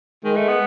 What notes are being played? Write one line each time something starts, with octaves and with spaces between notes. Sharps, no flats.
D#3 G#3
A3
B3